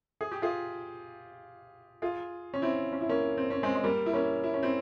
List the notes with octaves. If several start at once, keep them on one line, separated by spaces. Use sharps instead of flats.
G#4
G4
F4 G#4
F4 G#4
C#4
C4 E4
C#4
E4
A#3 C#4
C4
C#4
G#3 C4
G#3
G3 A#3
E4
A#3 C#4
E4
C#4
C4 E4